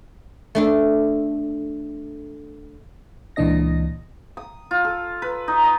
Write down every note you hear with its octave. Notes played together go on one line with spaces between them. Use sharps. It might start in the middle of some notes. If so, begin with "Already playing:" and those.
A3 D4 A4
C#2 A#2 E3 D4 D#5 A#6
D#6
F4
A4
B4
D#4
D#5